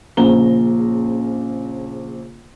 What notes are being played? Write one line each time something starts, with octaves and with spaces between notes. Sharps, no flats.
A#1 C#3 C5 A#5 G7